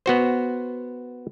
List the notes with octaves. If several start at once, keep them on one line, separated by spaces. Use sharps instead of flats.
B3 F#4 C5